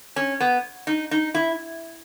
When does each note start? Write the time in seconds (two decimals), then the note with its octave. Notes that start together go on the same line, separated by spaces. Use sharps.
0.16 C#4
0.40 B3
0.87 D#4
1.11 D#4
1.35 E4